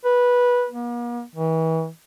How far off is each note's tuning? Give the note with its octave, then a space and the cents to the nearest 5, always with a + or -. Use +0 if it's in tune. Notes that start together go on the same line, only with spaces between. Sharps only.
B4 -15
A#3 +45
E3 -35